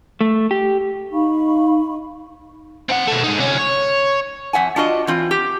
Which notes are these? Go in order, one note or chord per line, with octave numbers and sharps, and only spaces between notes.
A3
G4
D#4 F5 B5 C#6
C4 F#5
B2 A3
G#3 D#4
C3 C#4
C#5
F2 E5 F#5 G#5
D4 F4 F#4 D#5
E3 C4 F4
G4